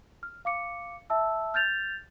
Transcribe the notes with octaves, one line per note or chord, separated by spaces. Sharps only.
F6
F5 D6 C#7
E5 A5 E6
F6 G6 A6 F7